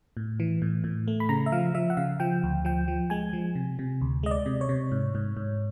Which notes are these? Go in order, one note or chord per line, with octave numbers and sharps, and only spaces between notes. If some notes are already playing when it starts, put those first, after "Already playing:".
A2
E3
A2
A2
A3
B5
C#3 A#5
E5
F3 F5
F3 E5
F#5
C#3 F5
F3 G5
D2
F3 G5
F3
G#3 G#5
F3
C3
C3
D2
G#3 D#5
D5
C3
C#5
C3
G#2
G#2
G#2